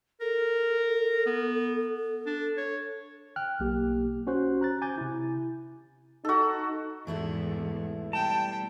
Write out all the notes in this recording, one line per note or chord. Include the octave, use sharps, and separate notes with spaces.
A4 A#4
B3
D4
C#5
G5 F6 F#6
B1 A#3 G4
C#4 F#4 C5 F#6
A#5 F#6 A6
G#5 D6 G6 A6
C3 E4
D#4 F#4 A4
E2 G#2 B2 A3 E4
G3 G5 A5